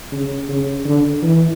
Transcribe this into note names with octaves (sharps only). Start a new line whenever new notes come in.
C#3
C#3
D3
E3